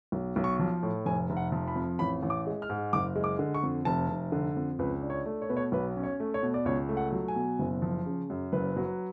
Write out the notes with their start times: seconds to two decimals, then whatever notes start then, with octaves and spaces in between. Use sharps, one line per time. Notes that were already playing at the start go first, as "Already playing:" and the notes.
0.12 B1
0.36 B1
0.44 C#6
0.59 F3
0.83 A2
1.06 F1 G#5
1.30 F1
1.37 F#5
1.52 F3
1.68 B5
1.76 F2
1.99 A1 B5
2.23 A1
2.30 D6
2.47 G#3
2.62 F6
2.70 G#2
2.93 F#1 D6
3.16 G#3
3.24 D6
3.39 D3
3.54 C#6
3.63 F2
3.85 F1 A5
4.09 F1
4.32 D3
4.57 F2
4.79 C#2 B4
5.03 D4
5.10 C#5
5.25 A3
5.42 C#5
5.49 B2 B4
5.57 C#5
5.72 B1 B4
5.97 C#4
6.03 C#5
6.20 A3
6.34 C#5
6.43 B2
6.54 D5
6.65 C#2 C#5
6.89 A3
6.97 F#5
7.12 F#3
7.28 G#5
7.36 B2
7.59 F#1
7.82 F3
8.06 C#3
8.30 F#2
8.53 F#1 B4
8.76 F#3